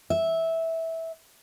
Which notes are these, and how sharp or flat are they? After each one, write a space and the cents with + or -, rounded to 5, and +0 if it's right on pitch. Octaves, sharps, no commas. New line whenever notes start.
E5 -15